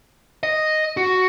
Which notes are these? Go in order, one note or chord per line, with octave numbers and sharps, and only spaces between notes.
D#5
F#4